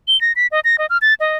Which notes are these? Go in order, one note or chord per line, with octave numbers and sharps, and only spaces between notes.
G7
A#6
B6
D#5
A#6
D#5
F6
A6
D#5